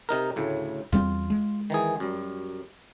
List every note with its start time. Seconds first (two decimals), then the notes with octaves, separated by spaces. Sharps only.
0.09 C3 D#4 A#4
0.36 D2 A2 C#3
0.92 E2 G3 C4 F4
1.30 G#3
1.70 D#3 E3 G#4
2.00 F#2 G3